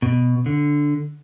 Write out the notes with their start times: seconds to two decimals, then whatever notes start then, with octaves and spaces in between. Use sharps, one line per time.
0.02 B2
0.46 D3